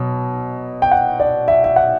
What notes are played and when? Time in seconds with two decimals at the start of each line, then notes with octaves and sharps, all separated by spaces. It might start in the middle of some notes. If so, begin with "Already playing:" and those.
Already playing: B2 F#3
0.82 G5
0.92 F#5
1.20 D5
1.48 E5
1.64 E5
1.76 F#5